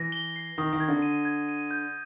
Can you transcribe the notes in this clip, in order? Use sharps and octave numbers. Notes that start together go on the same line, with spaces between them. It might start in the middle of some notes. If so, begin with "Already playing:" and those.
Already playing: E3 A#6
G7
C7
D#3 D#6
D#3
G#6
D3
D#7
G#6
D#7
G6